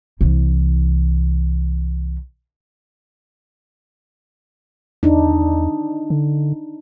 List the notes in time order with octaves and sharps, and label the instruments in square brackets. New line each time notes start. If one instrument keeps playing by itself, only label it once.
[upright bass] C2 E3
[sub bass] E2 [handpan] D4 D#4
[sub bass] D3